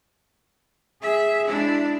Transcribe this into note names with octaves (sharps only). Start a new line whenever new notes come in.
G#4 E5
G#3 D4 E4